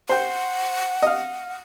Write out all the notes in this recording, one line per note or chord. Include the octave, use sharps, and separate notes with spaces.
C5 F#5 G5
D#5 F5